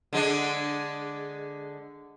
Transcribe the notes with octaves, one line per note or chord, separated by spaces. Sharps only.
D3 G#3 D4